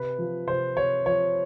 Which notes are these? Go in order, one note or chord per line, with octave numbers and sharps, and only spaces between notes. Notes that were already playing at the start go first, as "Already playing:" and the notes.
Already playing: C3 B4
F3
C3 C5
C3 C#5
F3 C#5